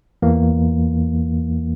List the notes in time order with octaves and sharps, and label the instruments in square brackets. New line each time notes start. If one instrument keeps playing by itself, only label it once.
[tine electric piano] E2 E3 A#3